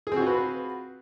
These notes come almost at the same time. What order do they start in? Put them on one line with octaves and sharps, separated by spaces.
G#4 C4 F#4 F4 B4